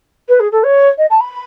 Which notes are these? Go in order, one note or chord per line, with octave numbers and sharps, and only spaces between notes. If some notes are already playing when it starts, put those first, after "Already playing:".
B4
G#4
A4
C#5
D#5
A5
B5